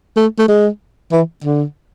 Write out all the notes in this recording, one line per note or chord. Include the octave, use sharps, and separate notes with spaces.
A3
A3
G#3
E3
D3